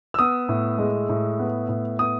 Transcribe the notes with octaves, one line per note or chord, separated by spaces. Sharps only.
E6
B3 D#6
A2
G#3
A2
B3
A2
B3 D#6